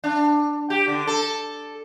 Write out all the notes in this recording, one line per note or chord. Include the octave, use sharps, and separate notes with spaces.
D4
G4
D3
A4